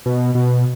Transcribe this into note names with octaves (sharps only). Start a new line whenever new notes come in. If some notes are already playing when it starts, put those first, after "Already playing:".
B2
B2